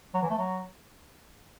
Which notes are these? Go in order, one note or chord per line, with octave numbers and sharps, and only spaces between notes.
F#3
E3
A3
F#3